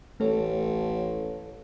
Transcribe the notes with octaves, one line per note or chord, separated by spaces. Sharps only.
A1 A3 A4 C#5